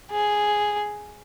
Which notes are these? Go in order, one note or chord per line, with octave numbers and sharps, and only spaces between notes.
G#4